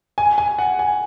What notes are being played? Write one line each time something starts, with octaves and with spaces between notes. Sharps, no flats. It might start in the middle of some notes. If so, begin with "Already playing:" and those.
G#5
G#5
F#5
G#5